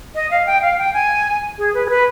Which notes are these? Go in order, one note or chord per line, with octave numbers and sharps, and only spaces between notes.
D#5
F5
G5
F5
G5
G#5
G#4
B4
G#4
B4